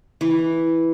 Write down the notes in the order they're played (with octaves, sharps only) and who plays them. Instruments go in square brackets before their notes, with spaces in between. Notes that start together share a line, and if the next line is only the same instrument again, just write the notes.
[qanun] E3